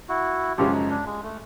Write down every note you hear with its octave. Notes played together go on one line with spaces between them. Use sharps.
E4 F#4
F#2 C#3 F3 G#3 C#4 F4 G4
D#4
D4
G#3
A3